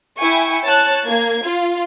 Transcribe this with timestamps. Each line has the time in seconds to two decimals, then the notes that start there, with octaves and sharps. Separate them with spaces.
0.19 E4 G5 G#5 C#6
0.65 C#5 A5 F#6
1.07 A#3 G#6
1.45 F4